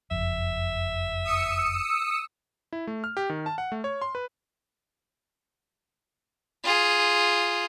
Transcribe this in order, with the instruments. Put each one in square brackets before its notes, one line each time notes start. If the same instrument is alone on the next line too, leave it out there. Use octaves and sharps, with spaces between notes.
[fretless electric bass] F#1 F2 [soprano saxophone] E5
[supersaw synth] D#6 E6 C#7
[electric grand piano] E4
A3
F6
G4
D#3
A5
F#5
A3
C#5
C6
B4
[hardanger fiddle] F4 G#4